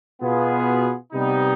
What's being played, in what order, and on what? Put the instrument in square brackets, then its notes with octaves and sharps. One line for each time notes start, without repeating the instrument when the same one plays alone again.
[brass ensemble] B2 B3 F4 G#4
C3 G3 B3 D#4